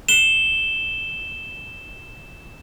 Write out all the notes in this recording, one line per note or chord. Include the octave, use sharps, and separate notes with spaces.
E7 G7